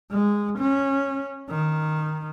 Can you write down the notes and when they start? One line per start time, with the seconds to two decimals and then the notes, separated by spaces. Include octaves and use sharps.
0.11 G#3
0.58 C#4
1.50 D#3